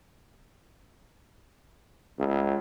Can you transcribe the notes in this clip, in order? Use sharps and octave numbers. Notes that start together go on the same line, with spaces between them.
C#2